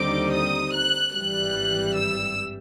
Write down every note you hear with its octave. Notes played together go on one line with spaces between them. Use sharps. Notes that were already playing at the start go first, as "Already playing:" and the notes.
Already playing: D#2 D3 G3 C4 D#4 D6
D#6
F#6
G#1 G2 E3 G3 F#6
E6